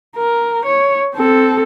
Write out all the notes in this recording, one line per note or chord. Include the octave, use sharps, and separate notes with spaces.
A#4
C#5
C4 A4